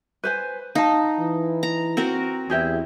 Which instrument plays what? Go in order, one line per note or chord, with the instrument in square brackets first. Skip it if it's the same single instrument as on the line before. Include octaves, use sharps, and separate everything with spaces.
[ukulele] B4 C5 G#5
[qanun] D#4 [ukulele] F5 A5
[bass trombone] E3
[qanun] A#5
C4 F#4 A#4
[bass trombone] E2 [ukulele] E4 G4 G#4